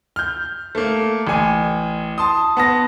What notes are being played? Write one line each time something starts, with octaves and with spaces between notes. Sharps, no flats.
F6 G6
A3 A#3
A1 G#5
A5 C6 D#6
B3 A5 A#6